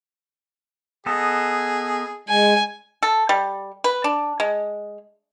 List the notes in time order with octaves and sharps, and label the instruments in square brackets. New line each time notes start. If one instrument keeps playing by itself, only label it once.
[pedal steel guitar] B3 A4 D#5 [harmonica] G#4
[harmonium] G#3 [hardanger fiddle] G#5
[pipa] A4
G3
B4
D4
G#3